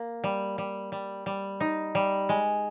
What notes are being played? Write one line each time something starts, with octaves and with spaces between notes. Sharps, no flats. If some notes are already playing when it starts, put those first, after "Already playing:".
Already playing: A#3
G3
G3
G3
G3
D#4
G3
G#3